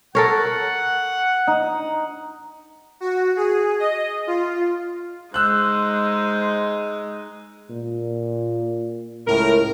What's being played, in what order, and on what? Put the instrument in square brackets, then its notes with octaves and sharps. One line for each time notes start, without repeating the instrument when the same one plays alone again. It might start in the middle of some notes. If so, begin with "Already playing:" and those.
[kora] A4 A#4 C#5 [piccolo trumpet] F#5
[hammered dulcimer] D#4
[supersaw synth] F#4
G#4
D#5
F4
[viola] G#3 D#4 [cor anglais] C5 [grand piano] E6 F#6
[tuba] A#2
[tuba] C#2 [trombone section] A2 [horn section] A#4